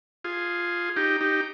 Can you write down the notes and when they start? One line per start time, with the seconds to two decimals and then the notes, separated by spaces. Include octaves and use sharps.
0.24 F4 G#4
0.96 D#4 G4
1.21 D#4 G4